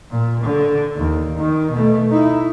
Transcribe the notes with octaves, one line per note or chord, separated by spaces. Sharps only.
A#2
D3
D#2
D#3
B2 A3
D#4 E4